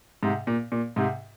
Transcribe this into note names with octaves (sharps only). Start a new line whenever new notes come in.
G#2 C3
A#2
A#2
G#2 C3